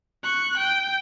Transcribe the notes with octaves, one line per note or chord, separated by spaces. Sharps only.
C#6 F#6
G5